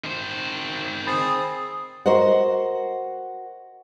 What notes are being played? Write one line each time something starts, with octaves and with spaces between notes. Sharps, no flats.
D#3 C5
C4 G#4 B5 D#6 A6 C7
F#4 A#4 C5 D#5 F#5